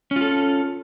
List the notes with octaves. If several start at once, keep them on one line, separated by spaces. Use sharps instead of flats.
C#4 F4 A4